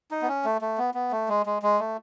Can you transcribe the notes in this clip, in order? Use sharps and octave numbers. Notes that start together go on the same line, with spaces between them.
D#4
B3
C#4
A3
A3
B3
B3
A3
G#3
G#3
G#3
A3